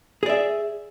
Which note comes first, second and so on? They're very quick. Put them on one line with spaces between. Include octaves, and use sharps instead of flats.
G#4 D5 E5